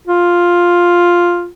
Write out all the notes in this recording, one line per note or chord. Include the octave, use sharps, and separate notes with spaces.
F4